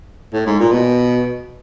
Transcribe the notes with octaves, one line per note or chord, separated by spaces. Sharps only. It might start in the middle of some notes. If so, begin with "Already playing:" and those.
A2
G#2
A#2
B2